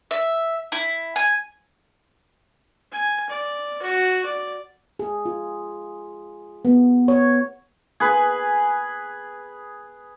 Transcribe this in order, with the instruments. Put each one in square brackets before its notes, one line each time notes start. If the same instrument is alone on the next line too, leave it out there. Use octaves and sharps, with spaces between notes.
[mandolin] E5
E4
G#5
[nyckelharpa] G#5
D5
F#4
D5
[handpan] G#4
F4
B3
C#5
[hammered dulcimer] G#4 B4